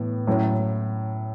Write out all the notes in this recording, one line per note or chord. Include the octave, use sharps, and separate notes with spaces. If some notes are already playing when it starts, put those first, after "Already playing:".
Already playing: A2 E3 B3
A2 F#3 C#4